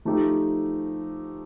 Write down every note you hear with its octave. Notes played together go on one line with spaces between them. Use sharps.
F3 A3 D#4 G4